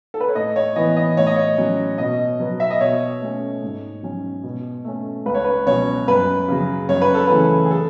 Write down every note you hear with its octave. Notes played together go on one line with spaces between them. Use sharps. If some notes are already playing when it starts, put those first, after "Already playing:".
A4
B4
C#5
A2 D#5
C#5
E3 B3 D#5
D#5
A2 C#5
D#5
C#5
F#3 C#4
B2 D#5
F#3 B3
E5
D#5
B2 C#5
A3 C#4
G#2
F#3 C#4
B2
A3 C#4
C#2 B4
C#5
B4
B2 F#3 C#4 C#5
F#2 B4
C#3 F#3
F#2 C#5
B4
A4
C#3 E3 A3 B4
G#4
A4